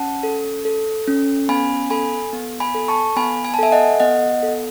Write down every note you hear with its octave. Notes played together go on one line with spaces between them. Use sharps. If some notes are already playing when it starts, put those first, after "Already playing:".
Already playing: C#4 F#5 A5
A4
A4
C#4
B3 G#5 B5
A4 G#5 B5
B3
G#5 B5
A4
A5 C#6
B3 G#5 B5
G#5
A5
A4 E5 G#5
D#5 F#5
B3 D#5 F#5
A4